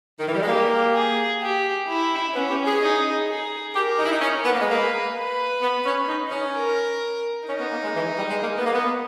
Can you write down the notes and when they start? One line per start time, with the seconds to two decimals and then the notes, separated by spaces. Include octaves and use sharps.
0.19 D#3
0.27 E3
0.34 G3
0.41 G#3
0.47 A#3 G4
0.95 G#4
1.41 G4
1.88 E4
2.35 B3 C#4
2.50 G4
2.66 G#4
2.81 D#4
3.28 G#4
3.75 G4 A#4
3.98 D#4
4.05 E4
4.12 D#4
4.21 C#4
4.45 B3
4.53 A#3
4.61 G#3
4.68 A#3 B4
5.15 B4
5.62 B3
5.86 C#4
6.08 D#4
6.28 D#4
6.31 C#4
6.55 A#4
7.48 C#4 D#4
7.60 B3
7.71 A#3
7.84 G#3
7.95 E3
8.18 G3
8.30 G#3
8.42 A#3
8.57 B3
8.66 A#3
8.73 B3